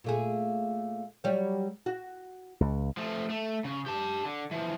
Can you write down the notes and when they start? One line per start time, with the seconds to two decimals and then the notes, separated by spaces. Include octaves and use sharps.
0.04 A#2 A3 G#4
1.24 F#3 G3 C#5
1.86 F#4
2.61 C#2
2.97 F3 A3
3.30 A3
3.64 C#3
3.86 G4 A5
4.25 D3
4.51 E3 F3